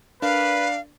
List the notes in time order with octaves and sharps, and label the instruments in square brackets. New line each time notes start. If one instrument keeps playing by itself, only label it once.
[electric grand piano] D4 A#4 D5 [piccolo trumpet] B4 [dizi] F5